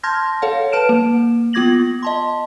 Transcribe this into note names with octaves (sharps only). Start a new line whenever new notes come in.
A5 C6 F6 G6 G#6 A#6
A4 C#5 F5 F#5
B4 A5 F6 D7 E7
A#3
B3 F4 D6 G#6 A#6 F#7
D#5 A5 C6